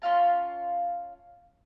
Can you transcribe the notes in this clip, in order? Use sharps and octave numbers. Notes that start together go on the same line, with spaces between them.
C#4 F4 F5 A5